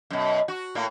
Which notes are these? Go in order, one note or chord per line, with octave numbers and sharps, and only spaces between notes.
F#2 B2
F#4
A2 A#3